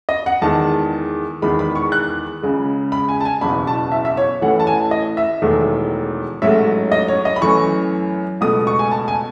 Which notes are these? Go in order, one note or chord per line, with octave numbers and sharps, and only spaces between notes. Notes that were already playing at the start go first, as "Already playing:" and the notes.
D#5
F#5
E2 D#3 G#3 A5
E2 D#3 G#3 B5
B5
C#6
F#6
C#2 C#3 G#3
B5
G#5
A5
G#5
F#1 E2 B2 B5
A5
E5
E5
C#5
A1 A2 E3 A3 F#5
A5
G#5
D#5
E5
E1 E2 D#3 A3
A1 G#2 F#3 A3 E5
D#5
C#5
D#5
B5
F#2 E3 A3 C#6
C#2 B2 A3 D#6
C#6
G#5
A5
G#5